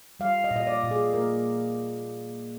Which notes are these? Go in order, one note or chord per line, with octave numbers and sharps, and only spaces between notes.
G3 F5
D#5
A#2
D#5
D5
A#2
G#4
A#3 A#4